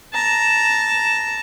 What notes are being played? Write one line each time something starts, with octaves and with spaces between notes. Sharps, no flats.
A5 A#5